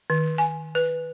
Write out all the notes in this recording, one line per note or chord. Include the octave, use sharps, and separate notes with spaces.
D#3
G#5
B4